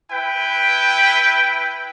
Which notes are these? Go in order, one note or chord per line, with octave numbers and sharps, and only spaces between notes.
E4 B4 G5